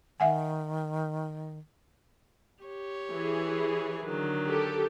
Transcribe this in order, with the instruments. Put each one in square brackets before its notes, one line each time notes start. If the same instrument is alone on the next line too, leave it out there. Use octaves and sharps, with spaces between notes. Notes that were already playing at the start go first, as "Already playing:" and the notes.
[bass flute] D#3 [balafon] E5 F#5 G#5
[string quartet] G4 C#5
[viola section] E3 G#4
[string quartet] D3 D#3 F#3
[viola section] G4 A4